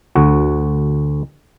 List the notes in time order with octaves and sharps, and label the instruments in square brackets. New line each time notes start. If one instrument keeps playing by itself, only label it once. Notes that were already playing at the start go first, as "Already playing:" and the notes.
[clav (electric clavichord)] D2 F#4